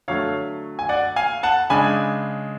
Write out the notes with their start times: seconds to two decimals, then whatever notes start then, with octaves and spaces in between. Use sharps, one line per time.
0.08 D3 F#3 A3 C#5 F5
0.79 G#5
0.89 D5 F#5
1.16 F5 G#5
1.43 F#5 A5
1.70 C#3 G#3 D4 G#5 B5